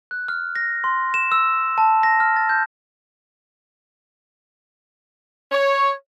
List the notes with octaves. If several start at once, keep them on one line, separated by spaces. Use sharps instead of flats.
F#6
F6
A#6
C6
E7
E6
A5
A#6
F6
A6
G6
C#5